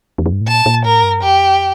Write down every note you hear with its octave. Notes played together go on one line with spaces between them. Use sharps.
E2
F2
G2
A2
A#2 A5
A#2
A2 A#4
G2
F2 G4